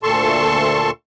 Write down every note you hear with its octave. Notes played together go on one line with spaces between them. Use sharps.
D2 A#2 A4 A5 C6 C#6